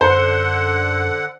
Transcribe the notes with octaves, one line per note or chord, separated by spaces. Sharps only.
F#2 D3 C5 F#5